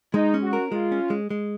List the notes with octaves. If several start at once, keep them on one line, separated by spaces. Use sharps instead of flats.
G#3 D#4
C#4
F#4
A#4
G#3 F4
C#4
G#3
G#3